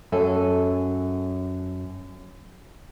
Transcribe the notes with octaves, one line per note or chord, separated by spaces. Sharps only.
F#2 A4 G#5